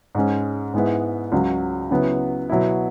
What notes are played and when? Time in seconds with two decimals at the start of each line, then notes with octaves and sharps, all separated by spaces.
0.15 G#2 G#3 C#4
0.74 G#2 G#3 B3 E4
1.32 C#2 C#3 F#3
1.91 C#3 F#3 B3 E4
2.50 B2 F#3 B3 E4